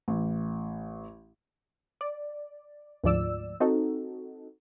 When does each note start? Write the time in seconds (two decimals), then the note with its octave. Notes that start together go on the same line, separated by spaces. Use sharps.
0.08 A1
2.01 D5
3.04 D2 G#2 F3 D5 E6
3.60 C4 D#4 F#4 A4